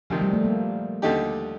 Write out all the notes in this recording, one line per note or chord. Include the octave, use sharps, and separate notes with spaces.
D2 C3 D#3 F3
G3
A3
A#3
D#2 D3 A3 D#4 G4